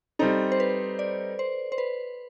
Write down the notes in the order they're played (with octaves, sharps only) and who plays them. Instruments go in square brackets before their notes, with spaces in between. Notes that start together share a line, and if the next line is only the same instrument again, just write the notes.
[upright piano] G3 C4 D#4 [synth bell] A4
[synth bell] C5
B4
D5
C5
C5
B4